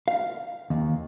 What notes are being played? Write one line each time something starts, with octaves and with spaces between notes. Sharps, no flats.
F5
D#2